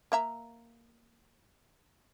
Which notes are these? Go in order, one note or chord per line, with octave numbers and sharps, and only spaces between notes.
A#3 E5 A#5